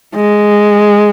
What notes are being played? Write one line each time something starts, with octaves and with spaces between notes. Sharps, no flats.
G#3